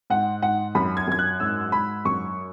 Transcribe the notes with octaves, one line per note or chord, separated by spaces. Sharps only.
G#2 F#5
G#2 F#5
F#2 B5
G#6
F#2 G#6
F#6
G#2 E6
G#2 B5
F#2 C#6